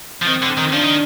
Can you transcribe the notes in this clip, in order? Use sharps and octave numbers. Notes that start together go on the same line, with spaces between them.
F3
D#3 C4
D3
D#3
F3 D4
D#3